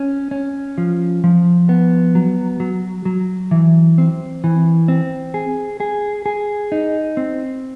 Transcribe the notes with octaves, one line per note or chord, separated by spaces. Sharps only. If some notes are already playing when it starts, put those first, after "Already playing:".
Already playing: C#4
C#4
F3
F3
B3
F#3
F#3
F#3
E3
C4
E3
C4
G#4
G#4
G#4
D#4
C4